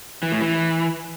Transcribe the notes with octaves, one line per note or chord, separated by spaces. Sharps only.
E3
A2
E3